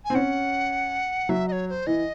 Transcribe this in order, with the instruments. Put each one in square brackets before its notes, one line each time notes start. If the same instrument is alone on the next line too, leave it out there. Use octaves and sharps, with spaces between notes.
[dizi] G#5
[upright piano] C4
[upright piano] C#4 [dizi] F#5
[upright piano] F#3 [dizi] E5
[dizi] D#5
C#5
C#5
C5
[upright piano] E3 [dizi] D#5